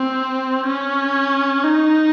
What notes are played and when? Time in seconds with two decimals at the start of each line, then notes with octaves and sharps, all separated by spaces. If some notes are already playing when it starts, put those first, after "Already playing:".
Already playing: C4
0.67 C#4
1.64 D#4